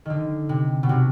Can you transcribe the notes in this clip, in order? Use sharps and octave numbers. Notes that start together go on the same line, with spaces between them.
D3 D#3
C3
B2
C3